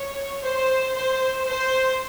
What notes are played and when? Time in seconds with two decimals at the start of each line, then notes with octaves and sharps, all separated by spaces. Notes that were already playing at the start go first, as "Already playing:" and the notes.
Already playing: C#5
0.42 C5
0.93 C5
1.45 C5